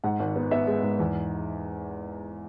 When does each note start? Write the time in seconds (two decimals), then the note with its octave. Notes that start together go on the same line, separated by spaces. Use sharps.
0.04 G#2 F#5
0.20 G#1
0.36 B3
0.51 B3 E5
0.67 G#3
0.83 G#2
1.00 E2